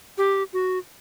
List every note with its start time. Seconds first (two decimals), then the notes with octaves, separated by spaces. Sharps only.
0.18 G4
0.53 F#4